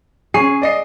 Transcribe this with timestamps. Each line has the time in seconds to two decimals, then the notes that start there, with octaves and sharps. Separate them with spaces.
0.34 C#4 G#4 C#6 C7
0.62 D5 D#5 C7